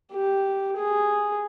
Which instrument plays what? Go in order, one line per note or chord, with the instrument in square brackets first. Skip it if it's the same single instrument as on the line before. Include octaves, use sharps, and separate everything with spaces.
[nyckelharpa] G4
G#4